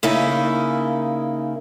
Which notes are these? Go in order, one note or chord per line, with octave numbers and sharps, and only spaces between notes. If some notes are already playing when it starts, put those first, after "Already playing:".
C#3 A#3 D#4 E4